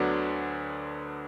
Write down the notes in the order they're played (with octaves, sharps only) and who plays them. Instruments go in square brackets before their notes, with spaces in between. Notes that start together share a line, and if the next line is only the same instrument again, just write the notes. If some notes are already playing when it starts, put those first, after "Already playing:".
Already playing: [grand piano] D2 D3 F#3 B3 D4